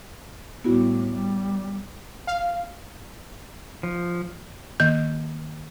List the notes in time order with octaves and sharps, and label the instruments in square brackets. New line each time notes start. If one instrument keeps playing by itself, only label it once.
[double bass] A2 G3 [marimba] B3 E4 F#4
[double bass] G3
[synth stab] F5
[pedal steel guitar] F3
[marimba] D#3 A#3 G6